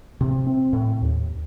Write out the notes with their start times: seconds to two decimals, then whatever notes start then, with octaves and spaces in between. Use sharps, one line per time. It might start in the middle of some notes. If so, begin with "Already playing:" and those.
0.21 C3
0.47 C4
0.73 A2
1.02 D#2